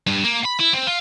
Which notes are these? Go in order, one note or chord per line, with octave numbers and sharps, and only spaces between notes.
G2
A#3
B5
E4
C4
F4